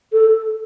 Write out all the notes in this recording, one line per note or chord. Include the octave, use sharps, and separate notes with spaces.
A4